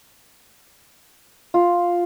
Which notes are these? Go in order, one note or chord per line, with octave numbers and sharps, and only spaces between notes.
F4